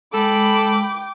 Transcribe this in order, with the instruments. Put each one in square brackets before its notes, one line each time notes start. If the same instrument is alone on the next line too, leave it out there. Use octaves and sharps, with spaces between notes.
[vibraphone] G#3 [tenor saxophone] A4 [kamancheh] G5 D6 [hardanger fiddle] B5